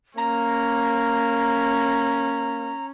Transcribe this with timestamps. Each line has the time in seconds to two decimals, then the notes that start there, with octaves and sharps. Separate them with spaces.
0.17 A#3 C#4 A#5